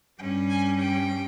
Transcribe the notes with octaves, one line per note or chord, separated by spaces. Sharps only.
G2 G3 C#4 G5
G#5
G5